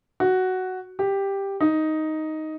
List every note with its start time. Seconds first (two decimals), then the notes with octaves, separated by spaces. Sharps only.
0.20 F#4
0.99 G4
1.61 D#4